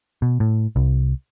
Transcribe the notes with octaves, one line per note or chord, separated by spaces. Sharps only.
B2
A2
C2